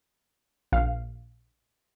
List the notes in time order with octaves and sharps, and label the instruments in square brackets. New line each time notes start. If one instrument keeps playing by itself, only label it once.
[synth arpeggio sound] A#1 F5